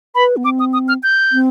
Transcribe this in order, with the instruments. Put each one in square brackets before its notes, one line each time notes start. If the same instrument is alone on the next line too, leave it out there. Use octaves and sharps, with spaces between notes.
[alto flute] B4 [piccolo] B5
[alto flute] B3
[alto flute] C4 [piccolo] D6
[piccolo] D#6
D#6
F6
G6
[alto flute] C4